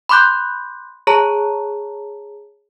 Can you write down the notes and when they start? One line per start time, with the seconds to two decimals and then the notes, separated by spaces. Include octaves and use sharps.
0.09 B5 C6 D6 F#6 G6
1.07 G#4 C#5 A5 A#5